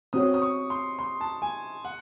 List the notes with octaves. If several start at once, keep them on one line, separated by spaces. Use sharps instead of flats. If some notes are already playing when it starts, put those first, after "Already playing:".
C4 F#4 C#5 D#6
D#6
C#6
C6
C6
A5
G#5
F#5